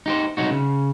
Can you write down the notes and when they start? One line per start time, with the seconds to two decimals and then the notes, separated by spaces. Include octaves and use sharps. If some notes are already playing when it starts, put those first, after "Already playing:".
0.06 D#4 G4 C5
0.37 C2 F#3 D#4 F#4
0.51 C#3